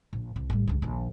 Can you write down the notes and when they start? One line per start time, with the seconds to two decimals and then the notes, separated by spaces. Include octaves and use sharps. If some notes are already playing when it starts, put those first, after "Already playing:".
0.13 A#1
0.36 C2
0.50 A1 G3
0.67 C#2 G2
0.82 A#1 D#2